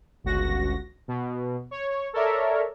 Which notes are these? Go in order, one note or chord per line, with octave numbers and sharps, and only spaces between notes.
G1 C#2 F#4 A#6
B2
C#5
A4 A#4 C#5 D5 E5